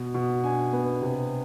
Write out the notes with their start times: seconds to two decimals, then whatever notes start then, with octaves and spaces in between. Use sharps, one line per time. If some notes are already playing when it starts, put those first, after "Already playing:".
Already playing: B2
0.14 B2
0.44 D4 G#5
0.73 B3
1.02 C3